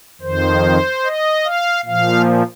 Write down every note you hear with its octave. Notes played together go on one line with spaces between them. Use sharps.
F2 D#3 C5
D#5
F5
A#2 F3 F5